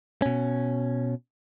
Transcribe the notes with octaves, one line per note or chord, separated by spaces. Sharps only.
B2 C#4